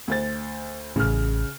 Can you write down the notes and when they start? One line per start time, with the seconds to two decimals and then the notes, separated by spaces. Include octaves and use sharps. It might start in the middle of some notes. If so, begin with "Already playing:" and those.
0.08 D2 C5 A6
0.96 A1 C#3 F6